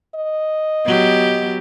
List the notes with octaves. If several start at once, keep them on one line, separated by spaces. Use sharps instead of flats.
D#5
F#3 B3 G4